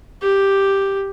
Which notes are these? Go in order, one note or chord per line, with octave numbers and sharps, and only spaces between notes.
G4